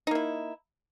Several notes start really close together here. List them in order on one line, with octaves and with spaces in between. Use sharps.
D#4 A#3 E4